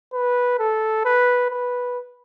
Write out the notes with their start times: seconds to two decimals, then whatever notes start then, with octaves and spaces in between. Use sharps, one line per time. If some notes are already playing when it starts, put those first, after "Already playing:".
0.14 B4
0.59 A4
1.05 B4
1.51 B4